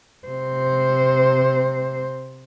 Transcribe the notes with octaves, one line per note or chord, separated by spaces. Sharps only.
C3 C5